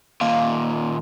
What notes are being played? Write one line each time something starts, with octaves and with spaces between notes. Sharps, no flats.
D#2 A#2 F5